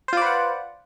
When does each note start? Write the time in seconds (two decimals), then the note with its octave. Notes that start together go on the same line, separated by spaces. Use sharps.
0.08 C5
0.13 F4
0.17 D5
0.22 B4
0.26 F#5